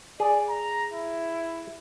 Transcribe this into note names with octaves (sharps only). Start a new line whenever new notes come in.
G#4 D5
A#5
E4